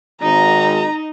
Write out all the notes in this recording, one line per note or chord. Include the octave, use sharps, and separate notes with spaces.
G#1 D#4 A#5